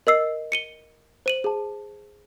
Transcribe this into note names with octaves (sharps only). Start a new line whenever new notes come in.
A#4 D#5 E6 C7
C#7 D#7 G7
C5 D#7 F#7
G#4 A5